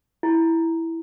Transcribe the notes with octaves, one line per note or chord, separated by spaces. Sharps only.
E4